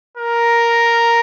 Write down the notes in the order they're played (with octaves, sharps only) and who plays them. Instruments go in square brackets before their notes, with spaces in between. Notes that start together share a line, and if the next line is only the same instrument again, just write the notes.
[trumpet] A#4